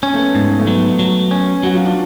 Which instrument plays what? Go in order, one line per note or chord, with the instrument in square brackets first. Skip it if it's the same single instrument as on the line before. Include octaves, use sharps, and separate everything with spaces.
[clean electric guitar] C#4
[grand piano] A3
B3
[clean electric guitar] G#2
[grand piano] B3
A3
[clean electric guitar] F#3 [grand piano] B3
[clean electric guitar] F#3
C#4
[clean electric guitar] F#3 [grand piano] F#4
[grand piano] F4
D4